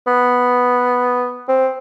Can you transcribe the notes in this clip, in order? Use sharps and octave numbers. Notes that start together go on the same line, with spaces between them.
B3
C4